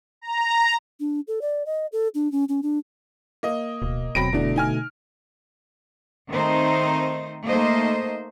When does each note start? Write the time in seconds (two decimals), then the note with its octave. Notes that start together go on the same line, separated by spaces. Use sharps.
0.21 A#5
1.00 D4
1.27 A4
1.42 D5
1.66 D#5
1.92 A4
2.15 D4
2.32 C#4
2.49 C#4
2.63 D4
3.43 A#3 D#5
3.82 D1 B2
4.15 D#1 B2 F#3 C4 B5 A#6 D7
4.33 F1 E2 B2 D3 A3 D4
4.56 D#4 G#5 F6
6.30 D#3 A3 C4 D#4 C5
7.47 A3 A#3 D#4 C5 D#5